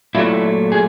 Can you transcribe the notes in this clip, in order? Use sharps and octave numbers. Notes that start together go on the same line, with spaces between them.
A#2 F#3 A3 E4
G#4